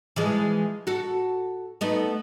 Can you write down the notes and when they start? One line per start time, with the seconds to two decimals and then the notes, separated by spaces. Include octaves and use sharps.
0.16 E3 F3 G#3
0.87 F#4 A4
1.81 A3 B3 D#4